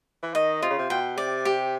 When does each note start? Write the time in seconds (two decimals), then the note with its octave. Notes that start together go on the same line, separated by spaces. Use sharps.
0.23 E3
0.34 D#3 D#5
0.62 C3 F4
0.70 C#3
0.79 C3
0.90 B2 G5
1.17 C3 D5
1.45 G4